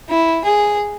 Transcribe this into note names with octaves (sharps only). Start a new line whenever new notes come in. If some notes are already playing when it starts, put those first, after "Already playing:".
E4
G#4